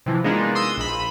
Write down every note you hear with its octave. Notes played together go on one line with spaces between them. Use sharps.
C3 E3 F3
G#3 A#3 B3 D4 D#4 F4
C6 D#6 E6
A#1 B5